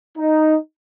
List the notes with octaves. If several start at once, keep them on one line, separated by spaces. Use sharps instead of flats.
D#4